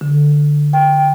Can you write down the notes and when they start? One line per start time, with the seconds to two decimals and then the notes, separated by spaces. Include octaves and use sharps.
0.01 D3
0.73 G5